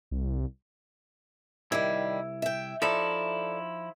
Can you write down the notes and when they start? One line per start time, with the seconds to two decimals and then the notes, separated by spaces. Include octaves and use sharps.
0.11 C2
1.72 C2 G#2 D#3 G3 E4
2.42 E5 G5
2.82 F3 D#4 E4 A4 D5